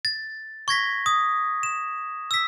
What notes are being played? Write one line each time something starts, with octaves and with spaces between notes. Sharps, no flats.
A6
C#6 G#6 A#6 B6
D#6
E7
E6 B6